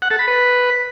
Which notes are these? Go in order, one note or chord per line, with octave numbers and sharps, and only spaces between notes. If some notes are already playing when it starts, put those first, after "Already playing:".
F#5
A4
B5
B4